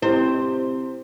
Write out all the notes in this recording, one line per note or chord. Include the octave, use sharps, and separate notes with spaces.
C3 C4 E4 G4 C5